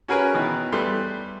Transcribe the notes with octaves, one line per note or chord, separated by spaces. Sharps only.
C#4 F#4 G#4 A#4 B4 C#5
B2 D#3 E3 B3
G3 A3 B3 C6